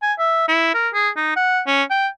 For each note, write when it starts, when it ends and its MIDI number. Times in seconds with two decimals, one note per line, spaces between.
0.02 0.13 80
0.18 0.46 76
0.48 0.74 64
0.74 0.88 70
0.94 1.09 68
1.17 1.34 63
1.36 1.61 78
1.67 1.83 61
1.90 2.07 79